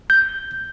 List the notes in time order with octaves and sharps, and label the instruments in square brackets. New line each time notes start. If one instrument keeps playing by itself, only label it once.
[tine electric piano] G6